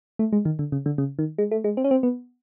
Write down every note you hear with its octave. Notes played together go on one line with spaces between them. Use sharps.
A3
G#3
D#3
D3
C#3
D3
C#3
D#3
G#3
A3
G#3
C4
C#4
C4
B3